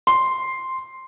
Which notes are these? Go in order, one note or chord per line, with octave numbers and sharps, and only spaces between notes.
C6